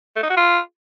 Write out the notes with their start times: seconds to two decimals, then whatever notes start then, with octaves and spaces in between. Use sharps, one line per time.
0.16 A3
0.23 D#4
0.30 F#4
0.37 F4